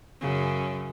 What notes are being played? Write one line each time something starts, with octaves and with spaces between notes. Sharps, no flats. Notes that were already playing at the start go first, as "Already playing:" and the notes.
F#2 C#3